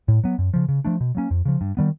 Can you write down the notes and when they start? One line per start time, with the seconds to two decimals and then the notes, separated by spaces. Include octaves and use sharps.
0.08 A2
0.24 F#3 B3
0.39 F#2
0.54 C#3 F3
0.69 C#3
0.85 F3 A3 D4
1.01 B2
1.15 F#3 A#3 C#4
1.31 F2
1.45 C#3 F3
1.61 G2
1.77 D#3 G3 B3